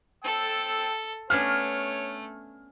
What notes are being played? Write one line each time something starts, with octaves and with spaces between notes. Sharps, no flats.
A4 G5 A5 E6
A3 B3 C#4 D4 C#5 F6